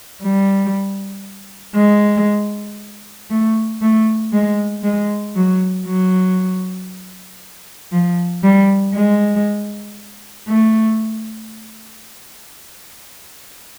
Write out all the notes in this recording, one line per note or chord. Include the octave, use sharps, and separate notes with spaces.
G3
G#3
A3
A3
G#3
G#3
F#3
F#3
F3
G3
G#3
A3